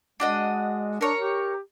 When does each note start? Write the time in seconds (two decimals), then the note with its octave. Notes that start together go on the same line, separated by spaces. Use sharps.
0.20 G#3 D4 F#4 D#5
1.01 D4 A#4 C#5 A#5
1.19 G4